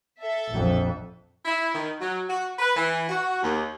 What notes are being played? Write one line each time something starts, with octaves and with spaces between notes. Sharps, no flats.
A4 E5
A#1 F2
E4
D#3
F#3
F#4
B4
E3
F#4
D#2